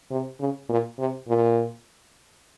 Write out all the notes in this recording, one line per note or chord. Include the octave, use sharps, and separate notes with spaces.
C3
C#3
A#2
C3
A#2